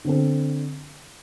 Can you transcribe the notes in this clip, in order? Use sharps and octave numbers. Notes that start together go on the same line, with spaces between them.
D3 C4 A4